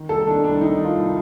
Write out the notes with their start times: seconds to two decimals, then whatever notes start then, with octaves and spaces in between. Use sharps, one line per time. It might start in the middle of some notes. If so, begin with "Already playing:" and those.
Already playing: D#3
0.09 C2 A4
0.27 D#3 D4
0.44 C2 D4
0.61 D#3 D#4
0.78 D#3
0.84 F4
0.96 C2